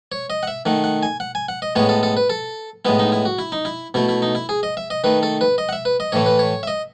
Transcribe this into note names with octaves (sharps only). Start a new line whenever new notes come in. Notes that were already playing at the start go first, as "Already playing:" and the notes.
C#5
D#5
F#5
E5
D#3 A3 F#5
F#5
G#5
F#5
G#5
F#5
D#5
A2 G#3 B3 C#5
A4
A4
B4
A4
A2 G#3 B3 E4
D#4
E4
F#4
E4
D#4
E4
B2 A3 E4
E4
D#4
E4
G#4
D#5
E5
D#5
D#3 A3 B4
A4
B4
D#5
F#5
E5
B4
D#5
A2 E3 A3 C#5
B4
C#5
E5
D#5